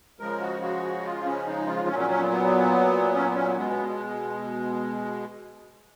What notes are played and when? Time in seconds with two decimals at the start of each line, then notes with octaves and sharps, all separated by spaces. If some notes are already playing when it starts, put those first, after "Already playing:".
0.20 C#3 F3 G#3 A#4
0.41 F#4
0.62 F#4
1.04 F4
1.25 C#4
1.47 D#4
1.67 F4
1.88 F#3 C#4
1.91 A#2
1.99 C#4
2.10 C#4
2.20 B3
2.30 B3
3.14 C#4
3.25 B3
3.36 C#4
3.46 B3
3.57 B2 G#3 B3
3.70 B3